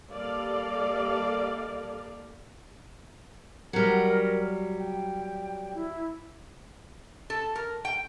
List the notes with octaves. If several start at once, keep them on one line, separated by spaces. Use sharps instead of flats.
G3 A#3 A4 D5 D#5 F5
F#3 G3 A#4
G5
E4
A4
A#4
G5